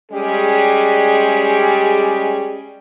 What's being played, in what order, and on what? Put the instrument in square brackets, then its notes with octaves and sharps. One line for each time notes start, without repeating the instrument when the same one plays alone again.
[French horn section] G3 G#3 C#4 G4 G#4